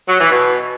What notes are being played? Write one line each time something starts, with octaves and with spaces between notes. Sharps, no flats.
F#3
E3
B2